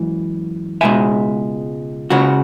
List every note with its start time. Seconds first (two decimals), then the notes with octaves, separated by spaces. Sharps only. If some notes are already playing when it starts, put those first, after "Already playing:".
Already playing: F#2 E3 G#3
0.81 C#2 B2 G#3 E5 G#5
2.10 C#2 C#3 G#3 C#4 F#4